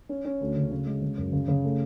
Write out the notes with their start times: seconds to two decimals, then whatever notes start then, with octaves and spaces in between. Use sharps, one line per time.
0.09 C#4
0.25 C#4
0.41 D2
0.57 C#3
0.71 C#3
0.86 G#3
1.02 C#3
1.17 F#2
1.32 C#3
1.48 C#3
1.64 A3